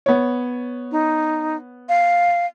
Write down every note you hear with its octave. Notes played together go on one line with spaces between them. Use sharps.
B3 C#5
D#4
F5